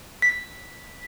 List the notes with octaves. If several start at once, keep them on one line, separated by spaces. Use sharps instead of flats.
B6